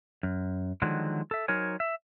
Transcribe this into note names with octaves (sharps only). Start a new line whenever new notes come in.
F#2
D3 D#3 F3 F#3 G#3
A4 E5
F#3 D#4 A#4 C5 C#5 G#5
E5